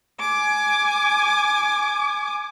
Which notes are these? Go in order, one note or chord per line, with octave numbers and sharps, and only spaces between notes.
G#5 D6